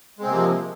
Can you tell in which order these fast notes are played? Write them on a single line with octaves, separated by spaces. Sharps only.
G#3 C4 C3 A#3 F3